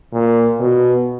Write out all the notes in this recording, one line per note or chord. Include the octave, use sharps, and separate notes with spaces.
A#2
B2